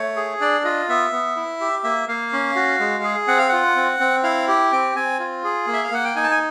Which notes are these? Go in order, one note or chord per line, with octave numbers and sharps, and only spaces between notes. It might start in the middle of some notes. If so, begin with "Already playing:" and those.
Already playing: A3 C#5
G#4
D4 D5
F4 D#5
B3 E5
B3
E4
G4
A#3 E5
A#3 F5
C#4
F#4
G#3
G#4
C4 F#5
F5
F4 F#5
C4
C4
E4 F5
G4
C4 G5
C4 G#5
F4
G#4
A#3
E5
F5
A#3 F#5
G5
D#4 G#5
A5
G#5